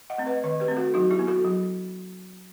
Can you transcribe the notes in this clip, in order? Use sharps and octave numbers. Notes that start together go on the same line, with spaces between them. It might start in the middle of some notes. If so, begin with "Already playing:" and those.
D#5 F#5
A3 C4
B4 D#5
D#3 B4 D#5
G4 B4
A3 C4
F#4 A4
F#3 D#4 F#4
E4 G4
B3
F#4 A4
F#3